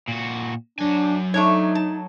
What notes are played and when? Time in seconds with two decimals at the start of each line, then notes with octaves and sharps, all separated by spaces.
0.08 A#2 F#4
0.79 F#3 D4 G#5
1.34 A3 D4 D#4 C#5
1.75 A5